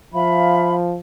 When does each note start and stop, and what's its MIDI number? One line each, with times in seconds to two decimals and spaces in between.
0.14 0.99 53
0.14 0.74 76
0.14 0.74 77
0.14 0.74 83